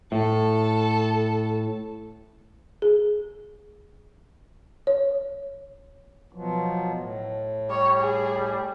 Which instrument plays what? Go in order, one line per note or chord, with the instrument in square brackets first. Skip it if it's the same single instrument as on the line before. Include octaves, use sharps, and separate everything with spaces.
[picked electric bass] A2 [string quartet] A4
[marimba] G#4
C#5
[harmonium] B2 F3 F#3
A2
[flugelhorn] G3 [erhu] C#5
[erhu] G#4